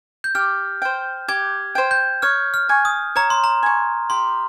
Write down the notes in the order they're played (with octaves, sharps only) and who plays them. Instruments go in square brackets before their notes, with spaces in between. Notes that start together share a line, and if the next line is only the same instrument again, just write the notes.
[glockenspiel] G6
[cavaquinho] G4 [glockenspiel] F6
[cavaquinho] C5 G5
[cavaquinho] G4 [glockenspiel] G#6
[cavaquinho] C5 G5
[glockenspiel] G6
[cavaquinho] C#5 [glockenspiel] F6
[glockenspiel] F6
[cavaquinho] G#5 C#6
[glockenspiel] D#6
[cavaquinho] C#5 [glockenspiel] A#5
[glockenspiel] C6
A#5
[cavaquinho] G#5 C#6
[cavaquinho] G4 [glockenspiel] C6